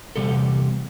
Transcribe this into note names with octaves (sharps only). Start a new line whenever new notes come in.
E2 C3 G3 A4